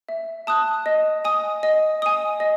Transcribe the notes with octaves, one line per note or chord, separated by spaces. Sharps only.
E5
A5 D#6 F#6
D#5
G#5 D#6
D#5
G#5 D#6
D#5